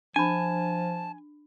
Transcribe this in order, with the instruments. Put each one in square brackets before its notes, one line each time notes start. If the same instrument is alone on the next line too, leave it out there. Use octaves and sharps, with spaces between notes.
[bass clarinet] F3 [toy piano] D4 B5 [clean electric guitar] G#5 [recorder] A5